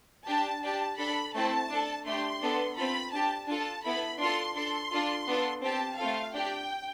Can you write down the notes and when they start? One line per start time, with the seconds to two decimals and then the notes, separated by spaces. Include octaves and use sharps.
0.27 D4 G4 A5
0.63 D4 G4 A5
0.98 D4 A4 B5
1.35 A3 C4 E4 A4 A5
1.70 D4 A4
2.06 A3 D4 G4 C6
2.41 B3 D4 A4
2.77 C4 F4 A4 B5
3.12 D4 G4 A5
3.48 D4 F4 A4 A5
3.84 B3 E4 A4 B5
4.20 D4 F4 A4 C6
4.56 D4 A4 C6
4.92 D4 F4 A4
5.28 B3 D4 F4 A4
5.63 C4 G4 A5
5.98 A3 C4 F4 A4 F5
6.34 D4 G4 G5